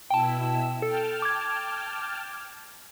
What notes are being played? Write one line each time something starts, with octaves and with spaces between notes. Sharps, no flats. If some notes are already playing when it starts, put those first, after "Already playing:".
B2 E4 G5 A5 E6
A4 G5 A5 F6
D6 G#6